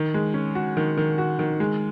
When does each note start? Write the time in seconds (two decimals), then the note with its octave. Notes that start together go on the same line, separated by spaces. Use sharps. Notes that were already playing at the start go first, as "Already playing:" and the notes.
Already playing: D#3
0.14 G#3
0.34 C#4
0.55 F#4
0.77 D#3
0.97 D#3
1.18 F#4
1.39 D#3
1.60 G#3